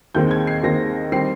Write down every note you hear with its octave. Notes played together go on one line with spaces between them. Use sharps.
D#2 D#3 G#3 C4 G6
G#6
C7
D#2 D#3 G#3 C4 A#6
D#3 G3 C4 C7